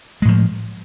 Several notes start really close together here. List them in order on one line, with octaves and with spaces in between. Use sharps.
G#3 A2 F3